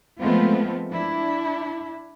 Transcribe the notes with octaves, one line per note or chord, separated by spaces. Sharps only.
F3 G#3 A3 B3 C4 F4
D4 E4